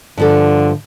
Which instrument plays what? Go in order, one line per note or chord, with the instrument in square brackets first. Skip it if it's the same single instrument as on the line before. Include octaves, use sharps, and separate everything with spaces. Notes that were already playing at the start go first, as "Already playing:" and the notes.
[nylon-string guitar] G2 F3 A4 [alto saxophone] D3